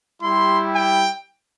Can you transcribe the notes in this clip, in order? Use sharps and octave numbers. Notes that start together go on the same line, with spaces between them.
G3 E4 G4 C6
G5